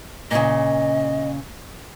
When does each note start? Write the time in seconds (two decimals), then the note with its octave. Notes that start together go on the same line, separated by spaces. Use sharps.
0.31 A#2 C#3 D#5